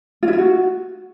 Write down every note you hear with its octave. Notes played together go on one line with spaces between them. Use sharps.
F4
E4
F4
F#4